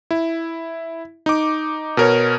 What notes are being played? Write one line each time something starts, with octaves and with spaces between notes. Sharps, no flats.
E4
D#4 D6
B2 A#4 C#5